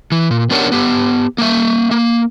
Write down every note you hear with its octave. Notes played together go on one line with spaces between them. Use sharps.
E3
A#2
B3 D4 G4 A#4 C#5 F#5
B3 G4
A#3 E5
A#3